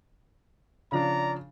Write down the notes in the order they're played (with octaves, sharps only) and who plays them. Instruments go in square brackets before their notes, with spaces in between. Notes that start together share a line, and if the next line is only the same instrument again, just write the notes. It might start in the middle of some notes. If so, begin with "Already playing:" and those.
[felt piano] C#3 F3 D4 [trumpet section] D5 A#5